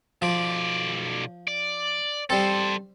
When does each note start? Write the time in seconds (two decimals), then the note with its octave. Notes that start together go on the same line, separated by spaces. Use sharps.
0.22 B1 F3 D5
1.48 D5
2.30 G3 C4 A4 C5